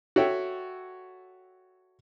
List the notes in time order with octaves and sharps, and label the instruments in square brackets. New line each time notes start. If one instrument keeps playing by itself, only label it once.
[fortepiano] F#4 A4 C#5 E5 G5